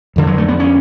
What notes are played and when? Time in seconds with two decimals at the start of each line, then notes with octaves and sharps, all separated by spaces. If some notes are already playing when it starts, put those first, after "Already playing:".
0.16 F2 D3
0.27 F#3
0.38 A3
0.48 B3
0.60 C#4